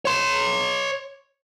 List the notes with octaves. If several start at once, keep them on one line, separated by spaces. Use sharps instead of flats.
C#5 C6